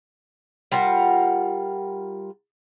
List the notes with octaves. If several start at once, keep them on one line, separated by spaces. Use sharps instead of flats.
G3 F4 A#4 F#5